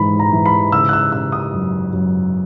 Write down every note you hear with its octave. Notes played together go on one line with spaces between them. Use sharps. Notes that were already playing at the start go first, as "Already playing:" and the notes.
Already playing: G#2 E3 B5
A#5
E3
B5
C#3 E6
F#6
E6
C#3 E6
D#6
F#2
F#2